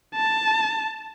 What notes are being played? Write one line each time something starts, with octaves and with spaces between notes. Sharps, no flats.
A5